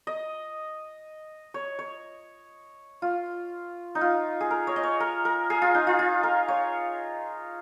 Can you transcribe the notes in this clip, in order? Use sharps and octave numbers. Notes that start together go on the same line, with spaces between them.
D#5
C#5
C#5
F4
D#4
F4
G#4
A#4
C#5
D#5
C#5
A#4
A#4
G#4
F4
D#4
F4
F4
A#4
C#5